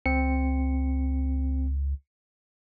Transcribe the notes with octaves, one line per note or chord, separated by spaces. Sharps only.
C#2 C4 C#7